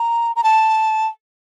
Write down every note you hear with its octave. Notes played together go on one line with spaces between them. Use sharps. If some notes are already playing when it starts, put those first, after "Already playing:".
Already playing: A#5
A#5
A5